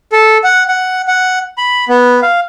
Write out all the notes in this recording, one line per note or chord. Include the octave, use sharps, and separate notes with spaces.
A4
F#5
F#5
F#5
B5
B3
F5